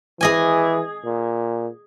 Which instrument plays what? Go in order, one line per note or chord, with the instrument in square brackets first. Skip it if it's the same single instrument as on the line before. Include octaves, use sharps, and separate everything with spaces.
[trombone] E3 [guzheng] G#4 D#5 G#5
[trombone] A#2